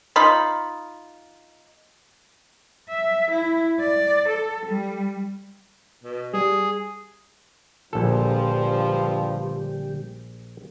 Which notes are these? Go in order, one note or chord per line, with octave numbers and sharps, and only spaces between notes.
D#4 F4 B5
E5
E4
D5
A4
G3
B2
G3 G#4
A#1 G2 D3 F3 G3 G4 A4